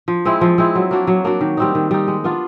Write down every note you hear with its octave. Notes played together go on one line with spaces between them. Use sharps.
F3
G#3 C4 E4
F3
G#3 C4 E4
F#3
A#3 D4 F#4
F#3
A#3 D4 F#4
D#3
G3 C4 D#4
D#3
G3 C4 D#4
G#3
B3 D4 F4